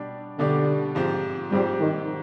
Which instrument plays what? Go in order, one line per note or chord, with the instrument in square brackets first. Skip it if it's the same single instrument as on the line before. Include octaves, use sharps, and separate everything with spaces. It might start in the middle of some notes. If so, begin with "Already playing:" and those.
Already playing: [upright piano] B2 G3 D4 G4 D5
[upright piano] B2 G3 D4 G4 D5 [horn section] D3
[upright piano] G#2 F3 C4 G4 C5
[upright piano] G#2 F3 C4 G4 C5 [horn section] G3
[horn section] D#3